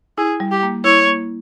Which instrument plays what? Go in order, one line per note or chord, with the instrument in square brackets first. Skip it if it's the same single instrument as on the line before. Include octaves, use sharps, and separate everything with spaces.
[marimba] E4 [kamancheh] G#4
[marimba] G3
[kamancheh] G4
[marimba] A#3
[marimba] E4 [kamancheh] C#5
[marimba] A#3